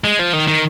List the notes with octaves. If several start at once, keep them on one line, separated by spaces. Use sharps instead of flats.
G#3
F3
D#3
D#3